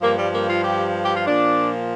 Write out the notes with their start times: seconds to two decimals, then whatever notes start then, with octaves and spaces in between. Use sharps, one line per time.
0.02 G2 F3 A#3
0.17 G3
0.33 A#3
0.49 F4
0.64 G4
1.04 G4
1.15 F4
1.26 A#2 F3 D4